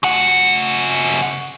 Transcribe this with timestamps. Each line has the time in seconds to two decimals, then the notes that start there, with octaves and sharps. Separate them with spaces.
0.03 C#3 F#5